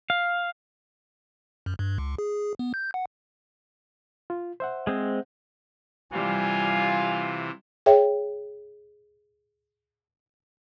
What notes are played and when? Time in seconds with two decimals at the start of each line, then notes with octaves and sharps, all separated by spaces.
0.10 F5
1.66 F#2
1.79 G2
1.98 C#2
2.18 G#4
2.59 B3
2.74 G6
2.94 F#5
4.30 F4
4.60 C5 E5 F#5
4.87 G#3 C4
6.13 C3 E3 G3 F4 G#5
7.86 G#4 C#5 E5 G5